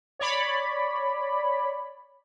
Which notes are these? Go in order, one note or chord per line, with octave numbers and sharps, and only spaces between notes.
C#5 D5 B5